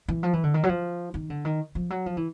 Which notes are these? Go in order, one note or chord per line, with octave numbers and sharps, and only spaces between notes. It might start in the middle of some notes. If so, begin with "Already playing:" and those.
E3
F3
E3
D3
D#3
F#3
F3
D#3
D3
D#3
F3
F#3
F3
E3